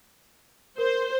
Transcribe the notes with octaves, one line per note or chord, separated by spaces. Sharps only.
A#4 C5